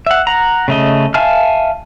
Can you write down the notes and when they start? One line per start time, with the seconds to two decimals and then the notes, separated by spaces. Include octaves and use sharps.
0.06 E5 F#5
0.27 F#5 A#5
0.68 C#3 A3 D#5
1.14 E5 F5 G#5 A5 F6